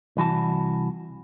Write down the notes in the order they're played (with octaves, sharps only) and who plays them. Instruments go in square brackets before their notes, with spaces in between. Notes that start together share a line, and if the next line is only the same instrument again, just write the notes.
[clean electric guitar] C2 E3 F#4 A5